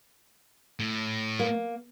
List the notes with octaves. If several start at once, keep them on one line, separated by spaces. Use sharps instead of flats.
A2
A#3